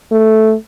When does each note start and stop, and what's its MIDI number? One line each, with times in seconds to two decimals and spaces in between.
0.12 0.54 57